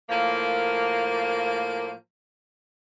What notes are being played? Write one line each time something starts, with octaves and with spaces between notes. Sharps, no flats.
A2 F3 A#3